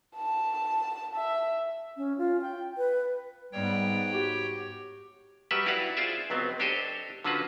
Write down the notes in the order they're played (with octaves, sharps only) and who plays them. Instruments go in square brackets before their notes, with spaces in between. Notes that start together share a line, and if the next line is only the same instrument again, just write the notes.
[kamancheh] A5
E5
[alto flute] C#4
F4
G5
B4
[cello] G#2 B3 [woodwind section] G3 [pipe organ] C#5 G5
[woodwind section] F#4 G4
[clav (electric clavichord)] F#3 G3 G4 B4 E5 F#5
E4 F#4 B4 D5 F5 F#5
F4 G#4 C5 D5 E5
C#2 F#3 B3 C4
D4 G4 A4 C5 C#5 D#5
D3 F#3 C#4 F4 F#4 B4